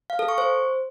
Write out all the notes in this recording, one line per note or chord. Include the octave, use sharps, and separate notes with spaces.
F5
A4
C#6
C5